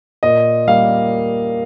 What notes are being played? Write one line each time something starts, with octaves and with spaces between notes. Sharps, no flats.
A#2 D#5
G3 A#3 F5